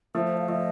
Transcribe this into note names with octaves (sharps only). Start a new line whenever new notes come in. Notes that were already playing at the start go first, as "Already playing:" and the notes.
F3 A3 C5
C5
F5
F3 A3 D#5